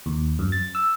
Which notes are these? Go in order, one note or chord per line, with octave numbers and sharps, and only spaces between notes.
D#2
F#2
A6
E6